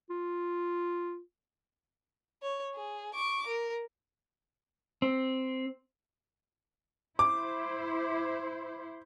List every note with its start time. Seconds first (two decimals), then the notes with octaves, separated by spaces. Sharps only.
0.10 F4
2.42 C#5
2.75 G#4
3.15 C#6 D6
3.47 A#4
5.02 C4
7.19 E4 C5 D6